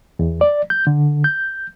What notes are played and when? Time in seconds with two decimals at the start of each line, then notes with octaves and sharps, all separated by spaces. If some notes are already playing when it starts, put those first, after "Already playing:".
0.19 E2
0.41 D5
0.70 G6
0.87 D3
1.24 G6